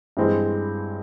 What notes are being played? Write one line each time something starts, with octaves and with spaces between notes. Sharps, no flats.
G2 E3 G#3 C4